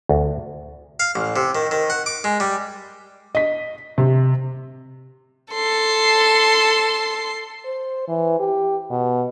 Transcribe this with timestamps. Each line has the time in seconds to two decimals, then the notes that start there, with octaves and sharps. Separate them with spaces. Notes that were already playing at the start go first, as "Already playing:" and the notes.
0.09 D2
1.00 F5
1.16 A1
1.36 C3
1.55 D#3
1.71 D#3
1.90 F#5
2.06 D6
2.24 G#3
2.40 G3
3.35 D#5 B6
3.98 C3
5.53 A4 C6
7.66 C5
8.09 E3
8.40 G4
8.90 B2